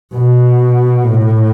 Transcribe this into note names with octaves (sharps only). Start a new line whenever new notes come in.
B2
A2